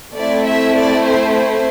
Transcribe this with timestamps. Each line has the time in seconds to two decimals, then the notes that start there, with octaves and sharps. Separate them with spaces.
0.15 A3 C4 E4 D5
0.46 E5
0.76 D5
1.05 C5
1.34 C5